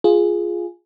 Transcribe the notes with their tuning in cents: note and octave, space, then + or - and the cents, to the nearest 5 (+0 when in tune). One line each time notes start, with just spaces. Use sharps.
F4 +0 G#4 +0